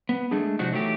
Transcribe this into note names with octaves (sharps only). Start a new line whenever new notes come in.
B3
G#3 A3 D4 G#4
C3 F3 D4 D#4 F#4
E3 F#3 A3 D#4 G4